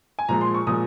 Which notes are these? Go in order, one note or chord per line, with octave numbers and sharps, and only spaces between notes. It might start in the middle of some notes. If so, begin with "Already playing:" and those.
G#5
A#2 F3 G#3 A#5
C6
C#6
A#2 F3 G#3 D#6